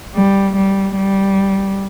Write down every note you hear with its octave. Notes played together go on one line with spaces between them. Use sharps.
G3
G3
G3